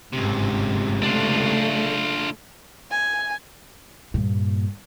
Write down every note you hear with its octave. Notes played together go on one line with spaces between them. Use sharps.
G1 C#2 G#2 C3
C#3 A3 D4 F4
G#5
G2 A#2